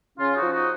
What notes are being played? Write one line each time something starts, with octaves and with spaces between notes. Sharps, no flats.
C#3 C#4 F4
D#4 F#4
F3
D#4 F#4